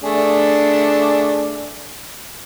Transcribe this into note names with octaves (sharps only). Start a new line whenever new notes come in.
A3 D4 G#4